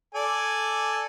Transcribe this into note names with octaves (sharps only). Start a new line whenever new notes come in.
A4 D5 G#5